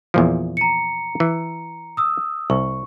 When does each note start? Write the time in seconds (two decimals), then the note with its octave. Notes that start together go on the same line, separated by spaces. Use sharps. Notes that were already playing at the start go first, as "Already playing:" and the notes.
0.14 E2 A#2 F3
0.57 A#5 C#7
1.20 E3
1.97 D#6 E6
2.50 C2 C#6